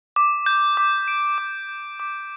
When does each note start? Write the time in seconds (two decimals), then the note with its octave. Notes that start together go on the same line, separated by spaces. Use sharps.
0.16 D6
0.46 G6
0.77 D6
1.08 D7
1.38 D6
1.69 G6
2.00 D6